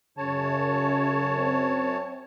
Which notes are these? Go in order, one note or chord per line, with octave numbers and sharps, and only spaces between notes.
F#2 C#3 C#5 A5
C4